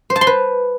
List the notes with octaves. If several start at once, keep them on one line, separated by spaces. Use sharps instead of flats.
C5
A5
C6
B4